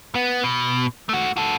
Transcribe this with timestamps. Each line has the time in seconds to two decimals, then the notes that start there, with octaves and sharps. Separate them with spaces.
0.15 B3
0.44 B2
1.09 A3 F#4
1.37 F#4 A4